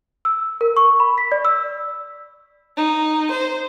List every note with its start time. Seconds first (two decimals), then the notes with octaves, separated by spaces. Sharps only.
0.25 E6
0.61 A#4
0.77 C#6
1.00 B5
1.18 B6
1.32 D5
1.45 E6
2.77 D#4
3.31 C5